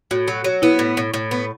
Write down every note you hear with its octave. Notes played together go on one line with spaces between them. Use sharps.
A2 F#4
F#3
F#3
B3 E4
A2
A2
A2
B3